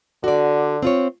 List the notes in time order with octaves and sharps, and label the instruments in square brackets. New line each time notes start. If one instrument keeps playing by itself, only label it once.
[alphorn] D3 [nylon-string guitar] F#4 D5
[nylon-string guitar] C4 F4 C#5